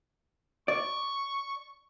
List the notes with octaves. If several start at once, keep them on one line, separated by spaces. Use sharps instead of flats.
D5 C#6